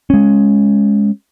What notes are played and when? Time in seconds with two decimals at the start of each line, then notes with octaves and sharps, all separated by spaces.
0.10 G#3 C#4